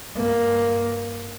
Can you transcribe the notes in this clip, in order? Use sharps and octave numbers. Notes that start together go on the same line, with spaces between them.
G2 A#3